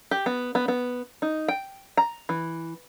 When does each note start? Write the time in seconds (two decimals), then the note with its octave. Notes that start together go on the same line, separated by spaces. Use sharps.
0.11 G4
0.26 B3
0.55 B3
0.68 B3
1.22 D#4
1.48 G5
1.97 A#5
2.29 E3